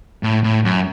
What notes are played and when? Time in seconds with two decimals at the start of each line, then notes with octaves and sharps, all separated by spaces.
0.23 A2
0.44 A2
0.65 F#2